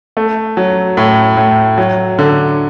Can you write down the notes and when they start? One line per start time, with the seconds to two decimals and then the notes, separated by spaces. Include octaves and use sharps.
0.17 A3
0.57 F#3
0.97 A2
1.37 A2
1.78 F#3
2.19 D3